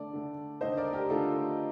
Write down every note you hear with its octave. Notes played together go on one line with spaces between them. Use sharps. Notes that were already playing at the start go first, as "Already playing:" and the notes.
Already playing: D3 A3 D5
D3 A3
D3 A3 C5 D#5
A#4 D5
G4 A#4
D3 A3 F4 A4